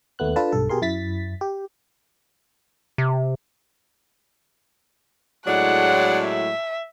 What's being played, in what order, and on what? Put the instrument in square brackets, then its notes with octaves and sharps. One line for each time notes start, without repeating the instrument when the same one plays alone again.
[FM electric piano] D#2 A3 B3 F#6
D4 F4 A4 B4 A5
B1 G2 A4
B2 G4 G#4 A#4 C6
F#2 E4 A6 B6
G4
[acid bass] C3
[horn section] A2 F#3 G#3 [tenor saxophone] D4 [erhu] F#5
[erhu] E5